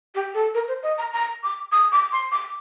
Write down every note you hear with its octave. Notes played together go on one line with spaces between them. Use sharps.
G4
A4
A#4
C5
D#5
A#5
A#5
D6
D#6
D6
C6
D6